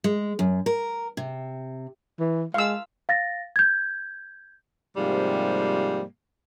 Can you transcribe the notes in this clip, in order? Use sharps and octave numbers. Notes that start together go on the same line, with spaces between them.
G#3
F#2
A#4
C3
E3
G#3 F5 E6
F5 A6 A#6
G6 G#6
G#2 C3 F3 G3 A#3